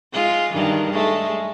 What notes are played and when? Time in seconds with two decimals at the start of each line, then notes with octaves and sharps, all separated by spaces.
0.13 G#3 F4
0.52 G2 D#3 E3
0.92 G#3 A3